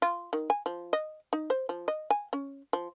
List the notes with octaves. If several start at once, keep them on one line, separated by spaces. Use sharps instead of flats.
F4
D#3
G#5
F3
D#5
D#4
C5
F3
D#5
G#5
C#4
F3